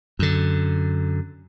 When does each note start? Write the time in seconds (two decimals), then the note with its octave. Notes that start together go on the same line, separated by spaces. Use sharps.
0.19 F#2 D3